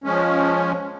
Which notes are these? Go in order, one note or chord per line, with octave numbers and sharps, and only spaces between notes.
F3 G#3 C#4